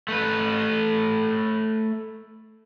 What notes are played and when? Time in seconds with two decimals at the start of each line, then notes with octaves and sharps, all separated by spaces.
0.08 A3 B4